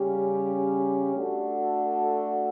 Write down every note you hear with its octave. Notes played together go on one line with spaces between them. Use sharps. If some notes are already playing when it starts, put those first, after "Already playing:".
Already playing: C#3 G3 C#4 G4
A3 D4 F#4 A4